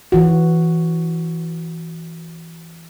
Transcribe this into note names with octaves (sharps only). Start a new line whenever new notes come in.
E3 F#4